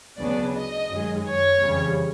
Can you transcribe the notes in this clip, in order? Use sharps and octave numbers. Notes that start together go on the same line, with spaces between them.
D2 C#3 F#3 B3 D4 D5
D#5
F#2 D#3 G#3
C#5
F2 C#3 E3 G3